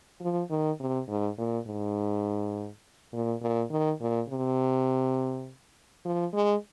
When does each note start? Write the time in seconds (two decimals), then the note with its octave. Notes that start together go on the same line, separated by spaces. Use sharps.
0.21 F3
0.51 D#3
0.80 C3
1.08 G#2
1.38 A#2
1.67 G#2
3.13 A#2
3.42 A#2
3.71 D#3
4.01 A#2
4.29 C3
6.05 F3
6.34 G#3